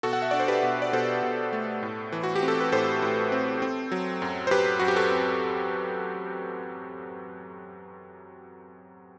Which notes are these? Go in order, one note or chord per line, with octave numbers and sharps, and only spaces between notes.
B2 F#4 A4
F#5
E5
D4 D5
C5
G4 B4
B2
D5
B2 A4 C5
B2
A3
A2
E3
F#4
G4
C4
A4
B4
A2 A4 C5
A2
C4
C4
F#3
F#2
C5
F#2 G4 B4
F#2 F#4
G4
F#4 A4
C4